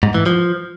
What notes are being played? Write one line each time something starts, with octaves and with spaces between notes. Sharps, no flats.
G#2
E3
F3